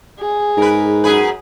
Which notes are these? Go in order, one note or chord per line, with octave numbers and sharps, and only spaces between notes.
G#4
G#2 A#4 B4
F#2 G#4 B4